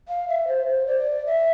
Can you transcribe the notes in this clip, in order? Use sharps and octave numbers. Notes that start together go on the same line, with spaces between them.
F5
E5
C5
C5
D5
E5